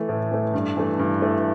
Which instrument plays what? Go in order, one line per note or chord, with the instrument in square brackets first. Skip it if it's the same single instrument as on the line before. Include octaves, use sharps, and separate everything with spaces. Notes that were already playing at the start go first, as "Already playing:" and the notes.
Already playing: [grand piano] E3 A3
A2
E3 A3
G2
E3 A3
G2
E3 A3